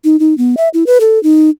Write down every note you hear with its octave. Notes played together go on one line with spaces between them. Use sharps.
D#4
D#4
B3
E5
E4
B4
A4
D#4